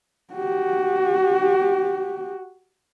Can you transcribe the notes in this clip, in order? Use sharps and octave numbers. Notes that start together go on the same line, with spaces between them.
F#4 G4